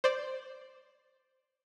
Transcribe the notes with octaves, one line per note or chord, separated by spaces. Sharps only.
C5 D5